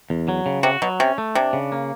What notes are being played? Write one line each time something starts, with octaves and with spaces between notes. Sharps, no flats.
E2
F#3
C#3
C3 F#4
B2 F#3
C3 C#4
A3
C3 D4
C#3
A#3